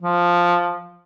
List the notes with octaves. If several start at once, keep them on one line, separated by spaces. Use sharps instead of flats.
F3